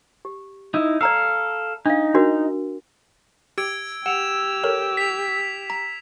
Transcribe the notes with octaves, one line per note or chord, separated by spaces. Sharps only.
G4
D#4 E4
A4 D5 F5 A#5 E6
D4 D#4 F5
D4 F#4 A#4
G4 E6 G#6 D7
G4 F#5 E6 E7 F7
A4 A#4 C#5
B6 F7
A#5